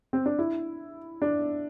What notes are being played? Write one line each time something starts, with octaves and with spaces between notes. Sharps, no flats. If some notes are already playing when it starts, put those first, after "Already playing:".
C4
D4
E4
D4